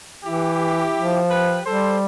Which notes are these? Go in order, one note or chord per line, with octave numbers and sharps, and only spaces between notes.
E3 E4 G4
F3
G4 B4
G3 A4 C5